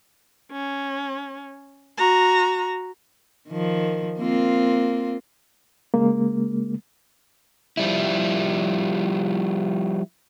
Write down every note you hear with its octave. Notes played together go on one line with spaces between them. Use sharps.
C#4
F#4 A#5
D#3 F3
A#3 C4 F4
C#3 G#3 A#3
F3 G3 E4